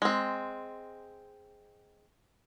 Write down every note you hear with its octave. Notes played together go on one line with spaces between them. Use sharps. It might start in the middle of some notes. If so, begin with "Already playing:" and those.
G#3 C4